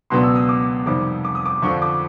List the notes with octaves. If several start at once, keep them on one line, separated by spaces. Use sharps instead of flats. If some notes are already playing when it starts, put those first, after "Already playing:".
C#2 B2 F#3 B3 D4 C6
E6
D#6
D6
F2 C3 D#3 G3 D6
D6
D#6
D6
F2 D3 F3 C#6
D6